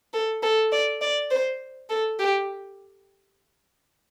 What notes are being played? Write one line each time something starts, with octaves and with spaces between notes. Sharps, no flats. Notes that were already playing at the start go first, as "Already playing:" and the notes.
A4
A4
D5
D5
C5
A4
G4